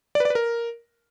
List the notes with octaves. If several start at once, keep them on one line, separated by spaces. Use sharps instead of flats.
D5
B4
D5
B4
A#4